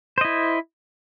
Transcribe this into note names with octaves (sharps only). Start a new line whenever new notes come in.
E4 C5 D#5